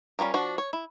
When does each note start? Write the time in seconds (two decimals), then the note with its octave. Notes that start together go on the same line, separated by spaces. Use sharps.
0.19 G3 C#4 F4 A#4
0.34 F3 D4 F#4
0.58 C#5
0.73 E4